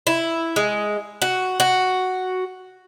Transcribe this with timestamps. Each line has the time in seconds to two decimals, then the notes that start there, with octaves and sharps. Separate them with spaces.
0.07 E4
0.56 G#3
1.22 F#4
1.60 F#4